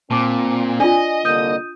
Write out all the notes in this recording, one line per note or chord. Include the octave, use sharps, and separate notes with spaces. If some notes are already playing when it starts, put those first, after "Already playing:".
A#2 C4 A5 D6
D4 F4 D5 D#5 G#5
C2 D3 A#3 D#6 G6 D#7